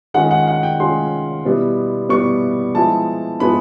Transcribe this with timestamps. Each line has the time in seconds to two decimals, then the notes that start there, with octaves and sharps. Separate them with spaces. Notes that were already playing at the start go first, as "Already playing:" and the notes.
0.14 D#3 G#3 C#4 F4 F#5
0.31 F#5
0.47 F#5
0.63 G5
0.79 D#3 G#3 C#4 F4 C6
1.45 B2 G3 B3 E4
2.09 B2 G3 B3 E4 C#6
2.74 F3 G#3 B3 E4 A5
3.39 F3 G#3 B3 E4 B5